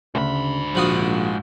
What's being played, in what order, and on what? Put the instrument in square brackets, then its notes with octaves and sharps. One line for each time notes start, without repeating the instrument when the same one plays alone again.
[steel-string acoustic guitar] D2 [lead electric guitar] G#2 B5 [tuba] C#3
[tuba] A#1 [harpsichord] F3 F#4 D#6